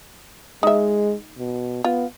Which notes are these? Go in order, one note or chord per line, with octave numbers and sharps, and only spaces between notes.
G#3 D#4 E5
B2
B3 F4